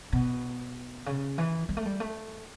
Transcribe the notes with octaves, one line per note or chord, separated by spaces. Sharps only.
B2
C#3
E3
G3
A3
G3
A3